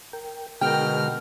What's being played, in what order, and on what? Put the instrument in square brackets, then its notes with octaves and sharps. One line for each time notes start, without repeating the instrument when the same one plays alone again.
[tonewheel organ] A#4 G5
[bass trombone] B2 [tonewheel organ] D3 G#3 G#4 [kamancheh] A#4 F6 [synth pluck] G5